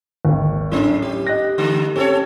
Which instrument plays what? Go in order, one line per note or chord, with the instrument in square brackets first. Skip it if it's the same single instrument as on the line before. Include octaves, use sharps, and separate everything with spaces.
[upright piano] G#1 D#2
[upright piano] A2 C#4 E4 [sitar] F#3 D4
[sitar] G4
[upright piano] D#5 F#6 A#6
[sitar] D3 A3
[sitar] C4 A4 C#5 [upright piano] C#4 G4